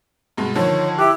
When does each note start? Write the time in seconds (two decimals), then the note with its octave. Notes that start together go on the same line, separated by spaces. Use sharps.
0.37 G2 B2 G#3
0.56 D3 D#3 F3 C#5
0.99 E4 G4 F#6